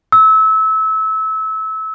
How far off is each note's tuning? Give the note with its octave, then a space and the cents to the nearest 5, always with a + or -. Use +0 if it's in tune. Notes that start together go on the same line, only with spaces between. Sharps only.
E6 -25